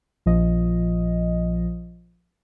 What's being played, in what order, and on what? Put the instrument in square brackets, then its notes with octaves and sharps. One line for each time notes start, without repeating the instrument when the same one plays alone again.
[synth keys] A#1 F3 D#5